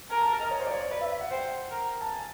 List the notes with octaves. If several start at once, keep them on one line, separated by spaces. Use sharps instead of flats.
A#4 G#5
A5
G#5
D#5
C#5
C5
D5
C#5
D5
B4 D5
E5
E5
F#5
C5 G5
A#4
A5
G#5